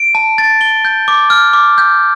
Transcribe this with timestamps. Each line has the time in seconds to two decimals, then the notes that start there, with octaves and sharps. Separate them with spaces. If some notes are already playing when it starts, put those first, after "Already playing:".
Already playing: D7
0.15 A5
0.38 A6
0.61 G7
0.85 G6
1.08 D6
1.30 F6
1.53 D6
1.78 G6